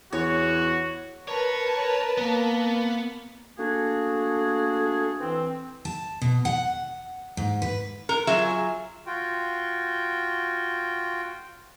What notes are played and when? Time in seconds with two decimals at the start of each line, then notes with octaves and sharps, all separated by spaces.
0.13 E2 F#4 C#5
1.28 A#4 B4 C#5 A5
2.18 A#3 B3
3.58 A3 A#3 D4 F#4 G#4
5.20 E3 C4
5.85 A5
6.22 B2
6.45 F#5
7.37 G#2
7.62 B4
8.09 A#4
8.27 F#3 F4 G#4 E5
9.06 F4 F#4 G5